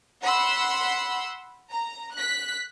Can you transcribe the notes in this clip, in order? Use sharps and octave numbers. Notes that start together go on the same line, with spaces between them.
F#5 B5 C6 E6
A#5
F#6 B6